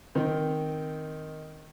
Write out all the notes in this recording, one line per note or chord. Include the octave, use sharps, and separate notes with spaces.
D#3 C4